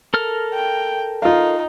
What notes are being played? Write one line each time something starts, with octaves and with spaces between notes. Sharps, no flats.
A4 A#4 F6
G5
D#4 F4 F5